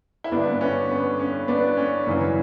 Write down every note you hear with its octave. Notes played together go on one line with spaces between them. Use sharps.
E4
G2 D3 B3 D4
B3
C#4
B3
C#4
B3 D4
C#4
F#2 C#3 E3